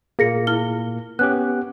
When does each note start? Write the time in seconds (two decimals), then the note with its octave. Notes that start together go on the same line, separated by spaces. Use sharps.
0.19 A#2 A#3 G#4 A#6 C#7
0.47 E4 F6 G7
1.19 B3 C#4 G4 F#6